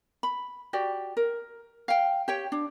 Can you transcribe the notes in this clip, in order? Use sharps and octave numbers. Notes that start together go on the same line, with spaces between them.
B5
F#4 G4 D5
A#4
F5 G5
G4 C#5 G5
D4